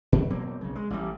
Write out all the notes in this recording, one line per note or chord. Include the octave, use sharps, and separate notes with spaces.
A#2
B2 F#3 A#3 C4
B1 C#3
G#3
A1 G3